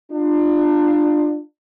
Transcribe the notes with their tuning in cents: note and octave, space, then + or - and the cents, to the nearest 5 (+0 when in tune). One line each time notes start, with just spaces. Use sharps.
D4 +30 F4 +0